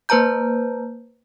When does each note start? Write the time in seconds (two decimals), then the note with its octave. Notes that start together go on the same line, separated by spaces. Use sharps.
0.09 A#3 B4 C5 A5 A#5 G6